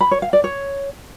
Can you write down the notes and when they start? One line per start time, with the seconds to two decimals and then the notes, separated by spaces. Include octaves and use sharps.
0.01 B5
0.11 C#5
0.22 F5
0.33 D5
0.44 C#5